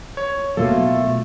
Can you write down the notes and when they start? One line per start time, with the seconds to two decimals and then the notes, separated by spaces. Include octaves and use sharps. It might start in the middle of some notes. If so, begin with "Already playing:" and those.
0.17 C#5
0.57 B2 F#3 A3 A#3 F4 A4